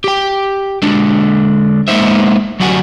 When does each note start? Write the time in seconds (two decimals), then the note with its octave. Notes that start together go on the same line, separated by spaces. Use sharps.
0.04 G4 G5
0.82 D3 G#3 D4
1.88 G#3 A#3 B3 D#4 C5 E5
2.60 D2 F#3 G3 F#4 F#5 G#5